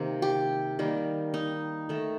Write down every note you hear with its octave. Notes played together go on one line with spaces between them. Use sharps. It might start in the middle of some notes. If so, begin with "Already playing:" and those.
Already playing: C3 D#3 A#3
G4
D#3 G3 A#3
D#4
D#3 A3